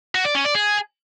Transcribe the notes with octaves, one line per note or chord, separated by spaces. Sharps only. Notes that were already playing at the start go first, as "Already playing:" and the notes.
F#4
D5
C#4
D5
G#4